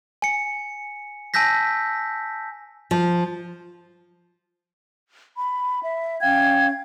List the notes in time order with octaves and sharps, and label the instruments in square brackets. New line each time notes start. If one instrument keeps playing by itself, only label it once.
[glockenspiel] G#5 C#7
G#5 A5 E6 G6 A#6 B6
[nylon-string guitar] F3
[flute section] B5
E5
C#4 F5 G5 G#6